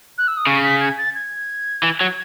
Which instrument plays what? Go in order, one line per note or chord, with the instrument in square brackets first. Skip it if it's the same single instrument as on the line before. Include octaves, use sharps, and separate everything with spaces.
[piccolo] F#6
E6
D#6
[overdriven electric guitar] C#3 [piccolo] C#6
[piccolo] B6
G#6
A6
G#6
[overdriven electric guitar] E3
F#3